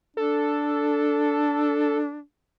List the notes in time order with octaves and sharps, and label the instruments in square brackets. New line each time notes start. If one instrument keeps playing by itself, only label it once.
[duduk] D4 [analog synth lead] A4